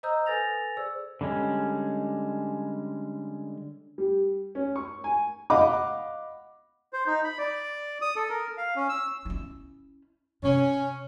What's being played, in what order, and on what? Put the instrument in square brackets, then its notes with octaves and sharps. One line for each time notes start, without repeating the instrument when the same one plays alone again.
[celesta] C5 D#5 A#5 D#6 E6 G6
A4 B4 G#5 A6 A#6 F7
G#4 C5 D5 E6
[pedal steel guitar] D3 G3 G#3 C#4
[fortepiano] G3
C#4
C#6
G#5
D#5 F5 F#5 B5 D6
[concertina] C5
D#4
B5
D5
D#6
A4
A#4
F5
C#4
E6
[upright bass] C#4 E4
[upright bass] C3 [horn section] C#4